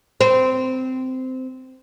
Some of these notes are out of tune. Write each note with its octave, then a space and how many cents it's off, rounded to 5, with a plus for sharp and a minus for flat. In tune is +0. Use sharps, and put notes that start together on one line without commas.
C4 -15